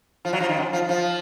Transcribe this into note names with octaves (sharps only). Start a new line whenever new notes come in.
F3
F#3
F3
D#3
F#2
F3
F3